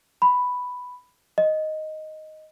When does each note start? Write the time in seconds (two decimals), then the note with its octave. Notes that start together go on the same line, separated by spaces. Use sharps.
0.22 B5
1.38 D#5